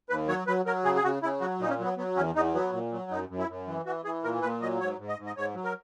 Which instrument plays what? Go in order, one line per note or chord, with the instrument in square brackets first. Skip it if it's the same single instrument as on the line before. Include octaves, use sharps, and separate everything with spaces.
[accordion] D#2 B4
F#3 C#5
F#3 B4
F#3 A#4
C#3 G#4
G#4
C#3 F#4
C#3 E4
F#3 F#4
A#2 D#4
C#4
F#3 B3
F#3 B3
E2 C#4
E2 D#4
F#3 B3
A#2
F#3
F#2 D#4
F#2
E4
F#2
E3
E3 F#4
E3 G#4
A#2 A#4
A#2 B4
F#3 D#5
G#2 C#5
G#2
D#5
G#2
D#5
G#2 C#5
F#3
A#4